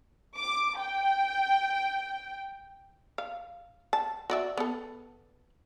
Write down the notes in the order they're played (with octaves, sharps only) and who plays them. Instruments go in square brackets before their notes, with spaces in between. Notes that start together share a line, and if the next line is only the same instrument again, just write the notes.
[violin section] D6
G5
[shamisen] F5
A5
F#4 D5 E5
B3 A4